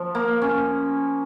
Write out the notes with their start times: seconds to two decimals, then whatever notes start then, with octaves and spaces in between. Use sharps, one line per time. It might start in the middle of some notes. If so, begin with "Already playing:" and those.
Already playing: F3
0.15 A#3
0.42 C#4